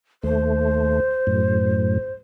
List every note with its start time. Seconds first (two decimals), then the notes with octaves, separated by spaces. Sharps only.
0.23 D#2 A3 C5
1.27 F#2 A2